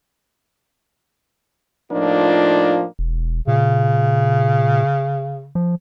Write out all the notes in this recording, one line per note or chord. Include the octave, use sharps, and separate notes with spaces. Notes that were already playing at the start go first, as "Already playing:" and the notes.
A2 F3 A#3 D4 D#4 F4
E1
A#2 C#3
F3